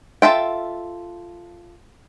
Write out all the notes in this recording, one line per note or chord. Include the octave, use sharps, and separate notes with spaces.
F4 A4 E5 G5